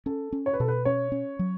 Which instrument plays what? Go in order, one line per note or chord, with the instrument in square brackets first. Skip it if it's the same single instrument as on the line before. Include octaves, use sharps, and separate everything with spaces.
[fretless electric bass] C#4 [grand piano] A4
[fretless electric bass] C#4
[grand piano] C#5
B4
[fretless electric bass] B2 [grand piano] A4
[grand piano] B4
[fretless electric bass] C#4 [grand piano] C#5
[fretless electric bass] C#4
F#3